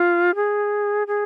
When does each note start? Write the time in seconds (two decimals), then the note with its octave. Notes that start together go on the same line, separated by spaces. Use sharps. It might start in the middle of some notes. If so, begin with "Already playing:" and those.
Already playing: F4
0.35 G#4
1.07 G#4